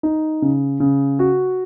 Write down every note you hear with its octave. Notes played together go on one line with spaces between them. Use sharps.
D#4
C#3
C#3
F#4